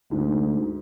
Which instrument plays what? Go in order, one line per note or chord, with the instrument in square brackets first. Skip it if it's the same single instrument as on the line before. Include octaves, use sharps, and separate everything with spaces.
[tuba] D2 [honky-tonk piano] G#2